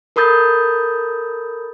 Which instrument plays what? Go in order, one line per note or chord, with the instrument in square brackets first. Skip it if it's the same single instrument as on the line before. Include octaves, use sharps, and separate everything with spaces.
[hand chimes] A4 A#4 B5 D#6 G6 A6